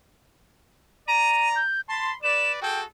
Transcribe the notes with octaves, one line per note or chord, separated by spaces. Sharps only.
D5 A#5 D#7
G6
A5 B5 C6
B4 D5 E7
F#4 G#4 A4 G5